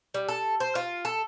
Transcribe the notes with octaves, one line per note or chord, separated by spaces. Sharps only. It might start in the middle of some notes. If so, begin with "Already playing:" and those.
G3
A4
C5
F4
A4